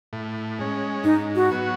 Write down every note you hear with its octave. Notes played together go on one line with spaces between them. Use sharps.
A2
G#3 C#4
G#2 D#4
F#4
F#3 B3 F#4